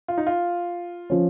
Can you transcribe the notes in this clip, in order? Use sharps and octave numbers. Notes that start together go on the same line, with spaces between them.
F4
D#4
F4
F3 C#4